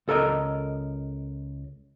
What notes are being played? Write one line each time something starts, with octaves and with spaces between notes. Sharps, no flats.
C#2 A4 A#4 D#5